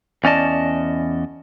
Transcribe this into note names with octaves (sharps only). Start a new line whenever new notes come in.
E2 C#4 D5 D#5 A5